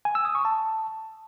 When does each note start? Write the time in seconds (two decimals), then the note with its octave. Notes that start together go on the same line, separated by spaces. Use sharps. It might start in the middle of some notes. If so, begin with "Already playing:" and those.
0.05 G#5
0.15 E6
0.25 D#6
0.35 C#6
0.45 A5